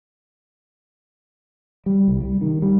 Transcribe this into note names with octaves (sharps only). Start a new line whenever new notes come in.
G3
C2
G3
D#3
G3